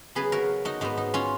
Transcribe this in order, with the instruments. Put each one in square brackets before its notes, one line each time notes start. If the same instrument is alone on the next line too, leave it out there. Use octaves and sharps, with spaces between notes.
[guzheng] C#3 F#3 B3 G#4 B4
F#4 A#4
D#4 F#4
G#2 F#3 B3 D#4
D#4
C#4 F4